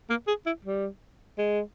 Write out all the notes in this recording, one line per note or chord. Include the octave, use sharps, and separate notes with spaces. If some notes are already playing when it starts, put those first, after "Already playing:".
A#3
G#4
E4
G3
G#3